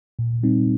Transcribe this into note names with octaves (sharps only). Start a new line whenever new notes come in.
A#2
G3 C4 D#4